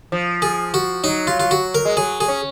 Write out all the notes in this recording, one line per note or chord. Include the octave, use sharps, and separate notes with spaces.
F3
G#4
F#4
F#3 D#4
F4
F4
F#4
A#4
G#3
F#3 G#4
G#4
C#4